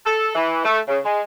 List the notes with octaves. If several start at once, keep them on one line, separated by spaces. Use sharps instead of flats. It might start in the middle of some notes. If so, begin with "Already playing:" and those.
A4
E3
A3
C#3
G#3